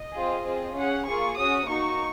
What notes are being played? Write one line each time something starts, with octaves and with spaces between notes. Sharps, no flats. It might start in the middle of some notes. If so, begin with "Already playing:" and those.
Already playing: D#5
C4 F4 G#4
C4 F4 G#4
C#4 G#4 F#5
A#3 F4 G#4 C#6
C#4 F#4 D#6
A#3 D#4 F#4 C#6